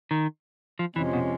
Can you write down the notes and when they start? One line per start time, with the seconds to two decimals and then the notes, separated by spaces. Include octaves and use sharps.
0.11 D#3
0.79 F3
0.96 F2 C3 E3 F3 G#3 C#4
1.13 B2